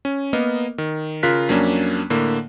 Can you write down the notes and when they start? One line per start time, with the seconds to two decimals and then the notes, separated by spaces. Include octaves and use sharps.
0.05 C#4
0.33 A#3 B3 A#4 D#5
0.78 D#3
1.23 C#3 F4 A#4 F#6 B6
1.49 F2 F#3 A#3 C#4 D4
2.10 A2 D3 A#3